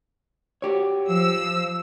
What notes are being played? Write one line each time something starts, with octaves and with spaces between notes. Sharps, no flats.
F#4 G4 C#5
F3 E6